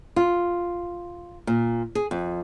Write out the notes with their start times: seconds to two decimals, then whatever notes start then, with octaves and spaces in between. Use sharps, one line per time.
0.16 F4
1.47 A#2
1.95 G#4
2.11 F2